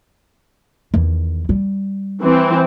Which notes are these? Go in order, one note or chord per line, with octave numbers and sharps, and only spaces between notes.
E2 D#3
G3
E3 C4